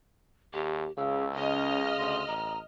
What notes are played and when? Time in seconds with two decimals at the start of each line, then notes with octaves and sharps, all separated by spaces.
0.53 D#2 G4
0.97 C#2 C#3 E6
1.37 C#3 C#4 D#5 F6
1.98 D2 C6
2.27 A1 A#5